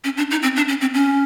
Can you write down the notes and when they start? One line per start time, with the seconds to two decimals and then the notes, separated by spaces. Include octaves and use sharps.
0.04 C#4
0.17 D4
0.31 D#4
0.43 C4
0.56 D4
0.68 C#4
0.81 C4
0.94 C#4